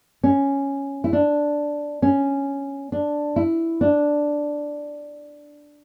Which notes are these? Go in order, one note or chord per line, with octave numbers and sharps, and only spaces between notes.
C#4
E4
D4
C#4
D4
E4
D4